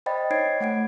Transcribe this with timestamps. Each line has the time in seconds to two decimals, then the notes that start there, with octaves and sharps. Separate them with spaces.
0.06 C5 D5 D#5 G5 B5 A6
0.31 D#4 C#5 G5 G#6 C7 D7
0.60 A3 F#5 G#6 D7